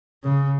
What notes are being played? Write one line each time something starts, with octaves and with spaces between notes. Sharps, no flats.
C#3